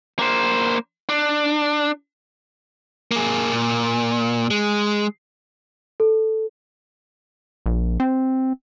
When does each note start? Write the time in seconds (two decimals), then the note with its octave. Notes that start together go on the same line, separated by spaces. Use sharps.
0.19 A#3 C5
1.09 D4
3.11 A#3 G#4
3.52 A#2
4.51 G#3
6.00 A4
7.66 A#1
8.00 C4